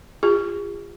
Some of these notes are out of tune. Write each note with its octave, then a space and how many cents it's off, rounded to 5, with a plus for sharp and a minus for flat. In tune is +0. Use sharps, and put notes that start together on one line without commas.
F4 +0 G#4 -40